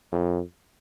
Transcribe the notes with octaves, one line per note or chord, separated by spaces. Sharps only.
F2